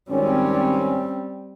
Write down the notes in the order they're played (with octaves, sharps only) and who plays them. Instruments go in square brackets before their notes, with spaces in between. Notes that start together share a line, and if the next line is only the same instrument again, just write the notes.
[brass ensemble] G#1 C#4 [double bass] G3 C4